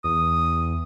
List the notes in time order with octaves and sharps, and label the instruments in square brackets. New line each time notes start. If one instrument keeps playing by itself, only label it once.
[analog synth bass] E2 [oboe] D#6